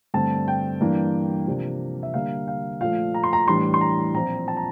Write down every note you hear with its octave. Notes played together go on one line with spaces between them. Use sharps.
G2 D3 A3 C4 A5
G5
G2 E3 A#3 D4
C3 F3 A#3 D4
E5
D3 G3 A#3 D4 F5
F5
A#2 F3 A3 F5
A#5
C6
A#5
A2 E3 G3 D4 C6
C6
A#5
A#2 F3 C4 A#5
A5
A#5